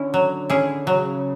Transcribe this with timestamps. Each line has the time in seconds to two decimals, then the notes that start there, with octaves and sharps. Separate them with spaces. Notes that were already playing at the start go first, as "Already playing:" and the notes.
Already playing: D3 C#4 E4
0.14 F#3
0.50 C#4 E4 G#4
0.86 C#3 F#3